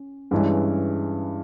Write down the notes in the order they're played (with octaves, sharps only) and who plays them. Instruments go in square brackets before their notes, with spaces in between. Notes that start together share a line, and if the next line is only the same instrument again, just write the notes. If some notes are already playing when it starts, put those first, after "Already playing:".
Already playing: [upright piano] C#4
G2 E3 G#3 C#4